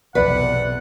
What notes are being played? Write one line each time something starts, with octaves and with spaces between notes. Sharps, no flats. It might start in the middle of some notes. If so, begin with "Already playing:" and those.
B1 E2 C3 B4 D5 E5 F#5